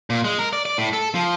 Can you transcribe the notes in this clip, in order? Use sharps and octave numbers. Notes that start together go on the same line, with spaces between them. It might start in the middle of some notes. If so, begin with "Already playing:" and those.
A#2
G#3
A#4
D5
D5
A2
A4
F3